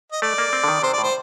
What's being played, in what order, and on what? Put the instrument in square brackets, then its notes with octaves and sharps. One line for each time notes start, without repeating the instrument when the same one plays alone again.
[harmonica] D#5
[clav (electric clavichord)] A3 [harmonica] D5
[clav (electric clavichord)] A#3
C4
D3
D#3
[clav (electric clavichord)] C3 [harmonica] C5
[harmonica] D5
[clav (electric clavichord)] A2
[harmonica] C5